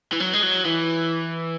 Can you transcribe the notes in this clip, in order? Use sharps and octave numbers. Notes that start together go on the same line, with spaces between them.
E3
F#3
G#3
F#3
E3